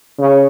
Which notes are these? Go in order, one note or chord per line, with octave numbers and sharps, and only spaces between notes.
C#3